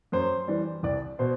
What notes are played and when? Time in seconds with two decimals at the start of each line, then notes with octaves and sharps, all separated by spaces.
0.12 F#2 C5
0.48 E3 G3
0.83 C2 D5
1.19 B2 C5